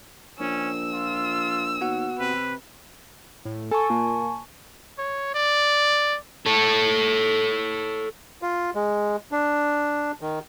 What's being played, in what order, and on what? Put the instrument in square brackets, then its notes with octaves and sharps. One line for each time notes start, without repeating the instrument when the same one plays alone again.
[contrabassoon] A#1 [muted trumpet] C#4 [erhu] E6
[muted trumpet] F4
[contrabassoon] D#2 [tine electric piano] B3 F#4 F#5
[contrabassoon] C3 [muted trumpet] B4
[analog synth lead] A2
[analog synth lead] A4 [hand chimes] G#5 A5 C#6
[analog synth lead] A#2
[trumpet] C#5
D5
[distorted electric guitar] A4 C#5
[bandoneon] F4
G#3
D4
D#3